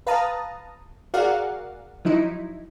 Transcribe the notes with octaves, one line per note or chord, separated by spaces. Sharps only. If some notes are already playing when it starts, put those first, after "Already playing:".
B4 F5 A5 A#5 D#6
F#4 G#4 A#4 D5 F5 F#5
F3 F#3 D#4 E4